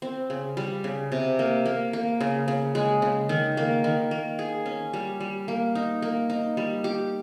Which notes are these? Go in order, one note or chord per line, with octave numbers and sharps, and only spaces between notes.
C4
C#3
G3
C#3
C3
A#3
A#3
A#3
C#3
C#3
G#3
C#3
D#3
A#3
D#3
A#3
G#4
C#4
G3
G3
A#3
D#4
A#3
D#4
G3
G4